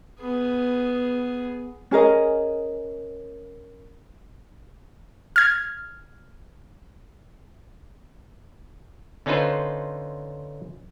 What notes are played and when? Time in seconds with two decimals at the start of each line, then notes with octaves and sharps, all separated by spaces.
0.21 B3 G#4
1.91 C#4 G#4 A#4 D#5
5.36 F6 G#6
9.26 D3 C#4 D#4 F4 B4 C5